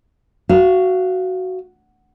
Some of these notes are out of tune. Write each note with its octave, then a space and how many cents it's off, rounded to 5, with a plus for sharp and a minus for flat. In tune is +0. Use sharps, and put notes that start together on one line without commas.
F#4 +5 F5 -25